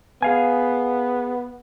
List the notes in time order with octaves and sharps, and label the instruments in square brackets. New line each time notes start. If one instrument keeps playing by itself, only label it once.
[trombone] B3 [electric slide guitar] G#4 F5 G#5